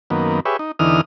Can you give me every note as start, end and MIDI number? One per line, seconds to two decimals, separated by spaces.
0.10 0.40 42
0.10 0.40 51
0.10 0.40 58
0.10 0.40 59
0.45 0.57 67
0.45 0.57 68
0.45 0.57 71
0.45 0.57 73
0.45 0.57 76
0.59 0.72 63
0.79 1.01 40
0.79 1.01 50
0.79 1.01 52
0.79 1.01 63
0.79 1.01 87
0.79 1.01 89